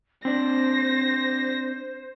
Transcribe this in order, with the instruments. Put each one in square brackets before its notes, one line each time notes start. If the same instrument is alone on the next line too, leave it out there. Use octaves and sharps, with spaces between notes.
[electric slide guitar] C4 D4 D5 [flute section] C5 [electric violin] A#6